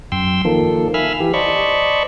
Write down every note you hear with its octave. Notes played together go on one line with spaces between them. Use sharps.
F#2 G5 C6 E6
D#3 F3 A#3 A4
E5 F5 G#5 B5 E6 F6
E3 G4
C5 D5 D#5 A5 B5 C#6